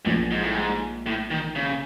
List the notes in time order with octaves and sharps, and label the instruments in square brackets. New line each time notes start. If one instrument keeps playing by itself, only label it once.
[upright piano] A#1 A#2 F3 [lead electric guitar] F#2
[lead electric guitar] G#2
A2
G#2
A2
D#3
C#3